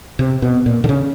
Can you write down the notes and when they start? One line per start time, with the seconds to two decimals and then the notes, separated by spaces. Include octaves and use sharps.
0.19 C3
0.42 B2
0.66 A#2
0.84 D3
0.89 C#3